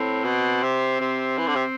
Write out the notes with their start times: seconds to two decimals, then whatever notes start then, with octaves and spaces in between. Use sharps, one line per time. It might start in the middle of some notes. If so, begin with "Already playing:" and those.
Already playing: A2 C4
0.24 B2
0.63 C3
1.01 C3
1.38 E3
1.47 D3
1.55 C3